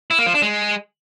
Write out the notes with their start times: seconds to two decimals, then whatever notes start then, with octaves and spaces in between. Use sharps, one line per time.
0.11 E4
0.18 A#3
0.26 F3
0.34 D4
0.42 G#3